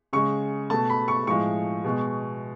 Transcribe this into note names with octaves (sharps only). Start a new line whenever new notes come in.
C#3 G#3 C#6
B2 A3 A5
B5
C#6
A2 F3 G#3 C#6
B2 G#3